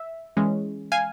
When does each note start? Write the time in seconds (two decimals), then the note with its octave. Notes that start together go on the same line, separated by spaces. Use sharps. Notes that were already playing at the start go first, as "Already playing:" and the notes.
Already playing: E5
0.37 E3 G#3 C#4
0.92 F5 G#5